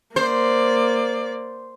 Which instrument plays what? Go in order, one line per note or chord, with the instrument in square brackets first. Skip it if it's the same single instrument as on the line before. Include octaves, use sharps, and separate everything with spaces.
[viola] A#3 D5 [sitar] C5